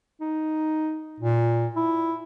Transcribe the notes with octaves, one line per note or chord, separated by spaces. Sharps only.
D#4
A#2
E4